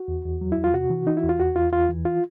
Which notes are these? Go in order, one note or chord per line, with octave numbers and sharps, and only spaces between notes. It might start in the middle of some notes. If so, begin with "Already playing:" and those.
Already playing: F#4
E2
E2
F#3
E4
E2
F4
C3 F#4
E3
E3 D#4
E4
E2
F4
E2 F#4
E2 F4
E2 F4
E3
F4